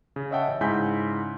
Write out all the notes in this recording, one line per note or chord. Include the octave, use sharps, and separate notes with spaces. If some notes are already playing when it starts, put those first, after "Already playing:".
C#3
C#5 D#5 E5 F#5 G5 A5
A1
G#2 C#3 E4 G#5 G6 B6